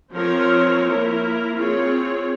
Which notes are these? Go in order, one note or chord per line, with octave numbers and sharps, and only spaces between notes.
F3 C4 F4 A#4 C#5
A#3 E4 A#4
C4 F4 G#4 C#5